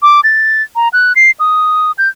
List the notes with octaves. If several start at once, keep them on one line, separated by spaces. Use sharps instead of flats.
D6
A6
A#5
F#6
C7
D#6
G6